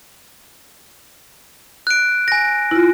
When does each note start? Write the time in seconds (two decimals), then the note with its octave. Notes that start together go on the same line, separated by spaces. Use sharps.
1.87 F#6 D7
2.28 G#5 A#6
2.71 E4 F4